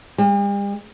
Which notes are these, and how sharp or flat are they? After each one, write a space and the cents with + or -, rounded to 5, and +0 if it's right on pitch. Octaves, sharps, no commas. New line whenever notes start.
G3 +45